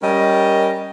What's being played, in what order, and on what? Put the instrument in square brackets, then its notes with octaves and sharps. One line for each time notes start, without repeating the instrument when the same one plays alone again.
[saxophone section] G3 C#4 A#4 D#5